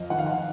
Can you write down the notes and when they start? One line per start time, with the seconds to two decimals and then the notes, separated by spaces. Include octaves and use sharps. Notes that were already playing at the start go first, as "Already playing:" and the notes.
Already playing: F2 D#5 F5
0.10 D#3 F#5
0.19 F5
0.26 F#5